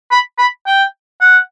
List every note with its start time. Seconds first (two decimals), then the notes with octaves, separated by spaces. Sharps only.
0.11 B5
0.38 B5
0.66 G5
1.21 F#5